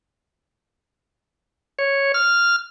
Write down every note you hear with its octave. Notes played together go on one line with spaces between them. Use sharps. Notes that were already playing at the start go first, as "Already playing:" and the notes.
C#5
F6